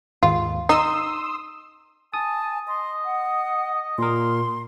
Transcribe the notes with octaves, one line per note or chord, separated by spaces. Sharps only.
D#2 G#2 F4
D#4 C6 D#6 E6
G#5 A5 D#6
D#5 C6
F#5
A#2 A#4 C6